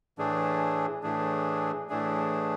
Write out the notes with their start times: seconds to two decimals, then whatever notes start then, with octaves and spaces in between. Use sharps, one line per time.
0.18 A2 E3 A3 D4 G#4
1.03 A2 E3 A3 D4 G#4
1.89 A2 E3 A3 D4 G#4